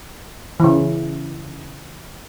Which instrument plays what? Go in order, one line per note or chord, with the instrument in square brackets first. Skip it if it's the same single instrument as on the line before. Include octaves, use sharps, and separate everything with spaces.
[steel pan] C#3 E3